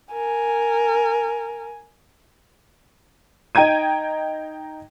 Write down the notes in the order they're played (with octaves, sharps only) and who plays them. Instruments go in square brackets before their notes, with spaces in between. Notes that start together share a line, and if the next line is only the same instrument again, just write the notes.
[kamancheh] A#4 G#5
[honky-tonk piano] D#4 G5 A#5 G#6 D#7